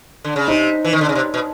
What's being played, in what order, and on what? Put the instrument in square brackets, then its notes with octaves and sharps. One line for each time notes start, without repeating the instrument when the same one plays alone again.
[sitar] D3
C#3
[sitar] C3 [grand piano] D#4
[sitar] E3
D#3
D3
C#3
C3
B2